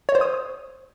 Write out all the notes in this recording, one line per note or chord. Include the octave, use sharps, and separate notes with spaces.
C#5
C5
D#6